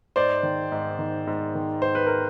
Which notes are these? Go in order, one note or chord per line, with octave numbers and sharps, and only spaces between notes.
G#2 C5 D5
D#3
G#2
D#3
G#2
D#3
G#2 C5
B4
A#4